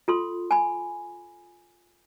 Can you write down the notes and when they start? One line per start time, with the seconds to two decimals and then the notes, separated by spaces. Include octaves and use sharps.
0.08 F4 A4 C6
0.51 G#5 B5